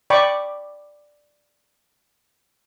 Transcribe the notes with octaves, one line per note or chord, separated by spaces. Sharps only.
D5 G5 B5 C#6 D6